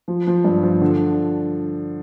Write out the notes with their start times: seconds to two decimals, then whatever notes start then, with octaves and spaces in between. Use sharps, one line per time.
0.08 F3
0.27 F3
0.44 G2
0.63 F3
0.82 D3